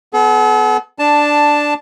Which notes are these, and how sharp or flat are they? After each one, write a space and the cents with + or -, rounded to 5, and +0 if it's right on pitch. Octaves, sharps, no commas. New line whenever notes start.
B3 +15 A4 -45
D4 +5 A5 +0